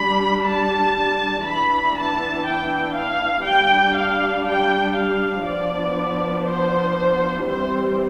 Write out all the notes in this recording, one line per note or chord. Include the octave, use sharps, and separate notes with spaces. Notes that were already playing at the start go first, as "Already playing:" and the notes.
Already playing: G3 D4 B5
A5
E3 B3 D4 B5
A5
G5
F5
G3 D4 G5
F5
G5
F5
F3 B3 D4 D5
C5
E3 G3 C4 C5